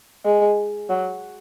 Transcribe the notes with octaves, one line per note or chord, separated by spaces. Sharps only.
G#3
F#3